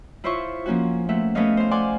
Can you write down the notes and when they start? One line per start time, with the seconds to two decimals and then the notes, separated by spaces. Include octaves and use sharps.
0.24 E4 F4 C5 C#5 E5 C#6
0.66 F3 A#3 C#4 F#4
1.09 A3 A#3 E5 F#5
1.35 A3 B3 C#4 C#5 D#5 F5
1.57 C5 F5
1.71 D5 F5 F#5 G#5 C6 D6